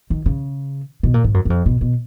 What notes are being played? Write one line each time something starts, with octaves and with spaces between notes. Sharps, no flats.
D#3
C#3
B2
A#2
G#2
F#2
F#2
F2
B2
B2